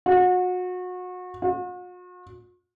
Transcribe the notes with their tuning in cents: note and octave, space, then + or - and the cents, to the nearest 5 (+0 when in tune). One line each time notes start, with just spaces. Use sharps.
F#4 -30
F#4 -45